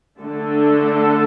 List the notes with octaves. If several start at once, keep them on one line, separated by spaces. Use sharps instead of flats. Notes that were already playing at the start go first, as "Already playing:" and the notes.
D3 A3 D4 A4